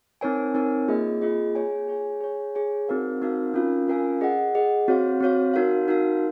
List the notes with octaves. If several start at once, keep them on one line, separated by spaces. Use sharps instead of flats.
C4 D#4 A#4 C#5 G#5
C4 D#4 A#4 C#5 G#5
A#3 F4 G#4 D#5
A#3 F4 G#4 D#5
G#4 C#5 G#5
G#4 C#5 G#5
G#4 C#5 G#5
G#4 C#5 G#5
C4 D#4 F#4 A#4 F5
C4 D#4 F#4 A#4 F5
C#4 F4 A#4 F5 G#5
C#4 F4 A#4 F5 G#5
G#4 D#5 F#5
G#4 D#5 F#5
C4 F#4 C#5 F5
C4 F#4 C#5 F5
D#4 F#4 A#4 F5
D#4 F#4 A#4 F5